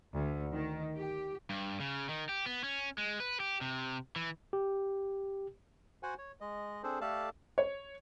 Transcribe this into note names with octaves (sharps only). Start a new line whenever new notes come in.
D2
D#3
G4
G2
C#3
D#3
G4
B3
C#4
G#3
B4
G4
C3
E3
G4
F#4 C5 F#5 G#5
C#5
G#3 D#5
C4 D4 G#4 A4 C5
A3 G4 A4 D5 F5 A5
C#5